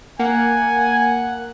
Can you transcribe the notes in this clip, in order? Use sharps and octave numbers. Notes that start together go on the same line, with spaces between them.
A#3 F#5 G#5